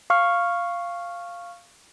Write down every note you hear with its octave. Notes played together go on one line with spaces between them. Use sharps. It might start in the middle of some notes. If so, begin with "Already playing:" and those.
F5 C#6 F6